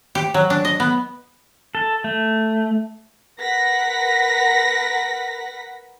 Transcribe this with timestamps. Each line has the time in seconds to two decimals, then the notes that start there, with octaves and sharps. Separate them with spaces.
0.15 G4
0.34 F#3
0.50 D4
0.65 D#5
0.80 B3
1.75 A4
2.04 A3
3.40 A#4 B4 F#5 A#6 B6